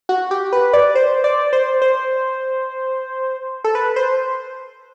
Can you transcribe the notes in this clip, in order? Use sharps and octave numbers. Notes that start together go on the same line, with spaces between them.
F#4
G4
B4
D5
C5
D5
C5
C5
A4
B4
C5